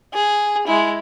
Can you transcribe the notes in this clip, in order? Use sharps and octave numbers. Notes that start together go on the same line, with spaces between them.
G#4
G#3 E4